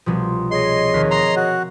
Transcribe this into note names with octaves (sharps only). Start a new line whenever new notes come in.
C2 B2 F3
G#4 C#5 D#5 C6
D#2 F6 B6
E5 A#5 C6 A#6
F#4